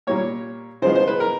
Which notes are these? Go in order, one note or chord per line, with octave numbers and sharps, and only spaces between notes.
A#2 G3 A#3 C#5
C#3 F3 G#3 B3 C5
C5
B4
A#4